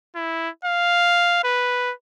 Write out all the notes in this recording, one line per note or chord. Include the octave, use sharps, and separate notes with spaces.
E4
F5
B4